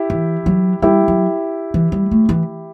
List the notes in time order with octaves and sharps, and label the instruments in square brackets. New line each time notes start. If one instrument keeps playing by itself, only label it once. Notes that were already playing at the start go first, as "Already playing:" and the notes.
Already playing: [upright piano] E4 G4
[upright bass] E3
F#3
[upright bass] G3 [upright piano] E4 G4
[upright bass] F#3
E3
G3
A3
E3